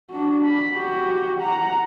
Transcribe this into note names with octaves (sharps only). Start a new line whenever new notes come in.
D4 F#4
B5
F#4 G4
F#5 A#5